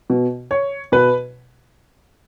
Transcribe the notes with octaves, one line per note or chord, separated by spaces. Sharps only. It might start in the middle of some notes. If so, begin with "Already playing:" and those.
B2
C#5
B2 B4